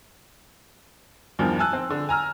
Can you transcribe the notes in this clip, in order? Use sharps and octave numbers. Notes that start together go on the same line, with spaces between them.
E2 G2 D#3 F3
G#5 A5 E6 F#6
C4
D3
G#5 A#5 E6 F6